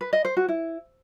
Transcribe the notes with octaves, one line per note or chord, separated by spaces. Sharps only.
B4
D#5
C5
F#4
E4